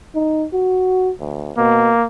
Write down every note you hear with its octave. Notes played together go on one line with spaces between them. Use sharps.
D#4
F#4
D2
B2 A#3